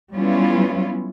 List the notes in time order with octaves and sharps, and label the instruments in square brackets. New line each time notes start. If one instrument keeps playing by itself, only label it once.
[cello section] F#3 G3 B3 C#4 E4 F4